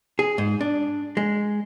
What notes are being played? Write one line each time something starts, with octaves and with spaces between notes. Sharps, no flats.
G#4
G#2
D4
G#3